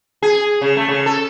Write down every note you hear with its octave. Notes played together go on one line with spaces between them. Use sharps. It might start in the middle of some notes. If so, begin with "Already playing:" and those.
G#4
C#3
A3
C#3
A4